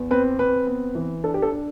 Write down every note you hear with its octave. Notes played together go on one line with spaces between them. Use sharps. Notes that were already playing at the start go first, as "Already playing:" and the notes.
Already playing: E2
C4 B4
C4 B4
B3
E3
D4 A4
G4
A4
D4